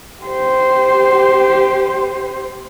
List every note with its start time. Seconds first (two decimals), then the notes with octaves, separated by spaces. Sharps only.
0.23 G4 C5